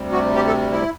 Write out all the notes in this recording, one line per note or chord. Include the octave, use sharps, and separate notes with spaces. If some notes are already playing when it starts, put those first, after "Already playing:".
Already playing: D2 C3 G3
F#4
G4
A4
E4